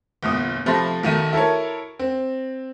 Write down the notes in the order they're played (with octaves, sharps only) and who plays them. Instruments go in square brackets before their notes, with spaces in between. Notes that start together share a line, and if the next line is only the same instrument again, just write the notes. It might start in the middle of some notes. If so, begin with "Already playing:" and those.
[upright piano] G1 E2 A#2 D#6
C3 F3 A3 B5 C6 A#6
B1 D#3 A3 D#7
E4 A4 A#4 C#5
C4